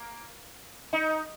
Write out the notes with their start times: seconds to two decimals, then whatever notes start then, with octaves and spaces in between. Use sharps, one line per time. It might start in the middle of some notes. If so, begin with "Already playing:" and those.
Already playing: A#3
0.93 D#4